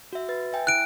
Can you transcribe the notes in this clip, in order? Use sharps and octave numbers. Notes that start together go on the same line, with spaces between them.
F#4 E5
B4 A6
E5 G5 G#5
E4 F#6 D7